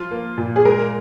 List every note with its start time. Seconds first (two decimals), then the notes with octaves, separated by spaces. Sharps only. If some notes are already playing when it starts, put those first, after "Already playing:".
Already playing: F3 F4
0.11 A#3
0.38 A#2
0.56 G#4
0.65 G#3 A#4